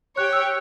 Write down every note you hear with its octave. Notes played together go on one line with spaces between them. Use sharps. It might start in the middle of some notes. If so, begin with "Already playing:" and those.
G4 C#5 G5 F#6
E6